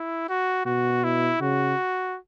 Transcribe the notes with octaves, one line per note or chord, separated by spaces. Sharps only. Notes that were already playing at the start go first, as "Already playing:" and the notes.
Already playing: E4
F#4
B2 F#4
E4
C#3 F#4